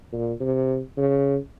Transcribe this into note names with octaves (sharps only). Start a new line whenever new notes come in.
A#2
C3
C#3